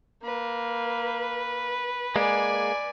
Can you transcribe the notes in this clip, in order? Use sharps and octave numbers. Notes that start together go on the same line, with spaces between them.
A#3 B4
G#3 A#3 D5 G#5